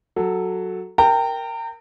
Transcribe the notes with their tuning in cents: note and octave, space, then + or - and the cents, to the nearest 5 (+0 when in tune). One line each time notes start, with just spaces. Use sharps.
F#3 +0 A4 +0
A#4 +0 G5 +0 A#5 -35